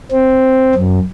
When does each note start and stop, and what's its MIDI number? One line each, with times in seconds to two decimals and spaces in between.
0.11 0.74 60
0.75 0.99 42